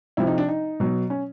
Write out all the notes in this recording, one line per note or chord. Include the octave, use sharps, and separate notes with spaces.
C3 F3 E4
D#4
D4
D#4
B2 F#3
C#4